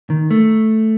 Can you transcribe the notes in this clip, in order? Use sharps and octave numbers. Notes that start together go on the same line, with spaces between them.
D#3
A3